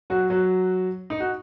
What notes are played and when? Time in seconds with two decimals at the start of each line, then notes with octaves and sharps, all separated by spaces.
0.10 F#3 F#4
0.30 F#3 F#4
1.10 D#4
1.20 F#4